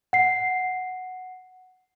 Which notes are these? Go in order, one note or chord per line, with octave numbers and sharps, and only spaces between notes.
F#5 C7